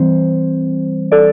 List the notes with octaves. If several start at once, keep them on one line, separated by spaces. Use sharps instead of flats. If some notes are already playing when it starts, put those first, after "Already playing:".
Already playing: E3 G3 C4 C5
A4 D5